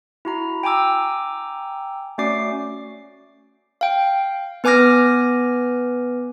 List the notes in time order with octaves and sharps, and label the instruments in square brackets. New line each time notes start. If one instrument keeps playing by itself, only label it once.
[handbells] E4 F#4 A#5
G5 G#5 A#5 D6 E6
A3 C#4 F#4 D5 D6 C7
F5 G5
B3 B4 G#5 D6 F6 A#6